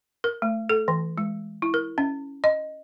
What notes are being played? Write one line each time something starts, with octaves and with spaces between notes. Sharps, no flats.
A#4
A3
A4
E3
G#3
E4
A#4
C#4
D#5